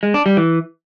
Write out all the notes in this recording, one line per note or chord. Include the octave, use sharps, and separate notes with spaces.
G#3
D4
G3
E3